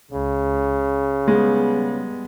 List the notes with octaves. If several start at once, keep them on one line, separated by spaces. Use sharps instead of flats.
C#2 C#3
G3 G#3 B3